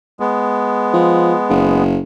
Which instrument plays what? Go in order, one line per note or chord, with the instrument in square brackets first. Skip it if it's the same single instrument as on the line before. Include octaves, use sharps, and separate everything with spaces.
[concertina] G#3 B3
[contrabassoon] F3
F#1